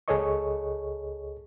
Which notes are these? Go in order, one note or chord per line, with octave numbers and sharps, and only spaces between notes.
C#2 G#4 A4 C#5 D#5 C#6